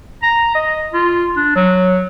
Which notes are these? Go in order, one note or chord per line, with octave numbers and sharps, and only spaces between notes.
A#5
D#5
F4
D4
F#3